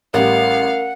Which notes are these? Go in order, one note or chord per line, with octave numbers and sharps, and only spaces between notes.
A1 G3 A#4 F5 F#5